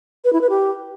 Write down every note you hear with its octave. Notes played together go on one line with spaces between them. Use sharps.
B4
E4
B4
G4